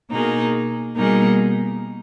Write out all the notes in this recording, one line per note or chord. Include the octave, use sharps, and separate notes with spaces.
B2 A#3 D#4 G#4
B2 G3 A#3 D#4 G#4